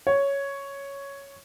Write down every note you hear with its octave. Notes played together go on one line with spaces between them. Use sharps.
C#5